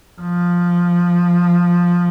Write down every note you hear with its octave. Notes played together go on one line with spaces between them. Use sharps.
F3